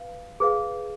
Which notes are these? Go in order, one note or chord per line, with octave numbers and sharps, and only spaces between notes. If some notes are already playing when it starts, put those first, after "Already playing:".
Already playing: B4 F5
G#4 B4 F5